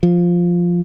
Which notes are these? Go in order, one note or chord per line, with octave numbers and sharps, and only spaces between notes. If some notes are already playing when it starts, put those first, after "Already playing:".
F3